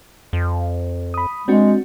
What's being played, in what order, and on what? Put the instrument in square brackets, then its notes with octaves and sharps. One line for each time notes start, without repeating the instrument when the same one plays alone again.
[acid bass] F2
[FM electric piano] B5 D#6
[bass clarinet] G#3 [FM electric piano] C4 D4 F#4